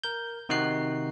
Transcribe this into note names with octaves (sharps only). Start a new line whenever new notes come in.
A#4 G6
C3 D#3 D#4 F#4 F#6 C7